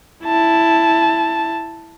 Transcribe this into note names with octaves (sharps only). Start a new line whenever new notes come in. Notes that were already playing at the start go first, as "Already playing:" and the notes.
E4 A5